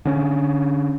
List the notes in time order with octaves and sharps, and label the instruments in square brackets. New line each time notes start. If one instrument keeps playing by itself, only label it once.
[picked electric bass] D3 C#4